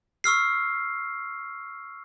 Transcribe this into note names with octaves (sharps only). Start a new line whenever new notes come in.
C#6 E6 F6 C7